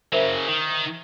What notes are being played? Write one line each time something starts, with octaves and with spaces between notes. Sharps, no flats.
C#3 F#3 A#4 C5 E5
D#3